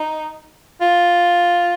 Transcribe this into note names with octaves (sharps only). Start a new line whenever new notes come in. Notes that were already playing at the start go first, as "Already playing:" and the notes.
Already playing: D#4
F4